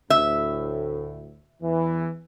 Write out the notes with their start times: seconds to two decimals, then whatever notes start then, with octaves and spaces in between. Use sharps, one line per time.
0.10 D2 A2 E5
1.62 E2 E3